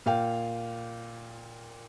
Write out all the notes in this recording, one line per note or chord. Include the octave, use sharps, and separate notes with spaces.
A#2 F5 G5